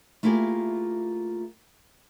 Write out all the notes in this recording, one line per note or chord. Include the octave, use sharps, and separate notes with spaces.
A3 A#3 E4 F4 G4 G#4